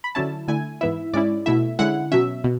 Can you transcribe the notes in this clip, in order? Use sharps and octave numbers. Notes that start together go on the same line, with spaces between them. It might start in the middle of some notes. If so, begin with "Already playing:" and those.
B5
D3 F#3 C#4 E4 A5
D3 A3 E4 G#5
G#2 E3 B3 E4 E5
G#2 G#3 C#4 E4 D5
B2 A3 E4 E5
D3 G#3 C#4 E4 F#5
B2 F#3 C#4 E5
B2